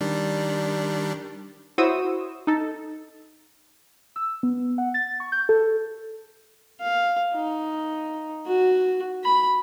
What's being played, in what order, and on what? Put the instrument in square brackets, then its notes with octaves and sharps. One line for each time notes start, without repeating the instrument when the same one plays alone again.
[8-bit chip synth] D#3 G3 D4
[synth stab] E4 F#4 C5 C#5 D#6 E6
D#4 A4
[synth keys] E6
B3
F#5
A6
C#6
G6
A4
[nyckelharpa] F5
D#4
F#4
B5